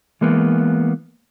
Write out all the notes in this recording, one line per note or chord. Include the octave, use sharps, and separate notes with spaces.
E3 G#3 A#3 B3